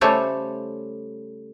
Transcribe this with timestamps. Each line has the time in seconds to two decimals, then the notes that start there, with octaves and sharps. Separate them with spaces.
0.01 C#3 G3 A3 A4 C5 C#5